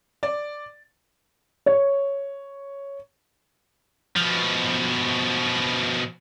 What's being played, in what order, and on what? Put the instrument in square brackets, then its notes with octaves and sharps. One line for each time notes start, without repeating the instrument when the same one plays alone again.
[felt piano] D5
C#5
[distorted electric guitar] B2 F3